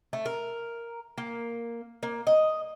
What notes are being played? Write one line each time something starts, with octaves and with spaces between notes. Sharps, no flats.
A3
A#4
A#3
A#3
D#5